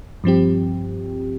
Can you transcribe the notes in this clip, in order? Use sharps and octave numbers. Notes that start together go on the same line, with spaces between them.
G2 F3 C4 G4